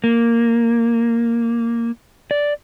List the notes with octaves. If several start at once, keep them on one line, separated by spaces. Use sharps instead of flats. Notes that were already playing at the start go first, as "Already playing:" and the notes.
A#3
D5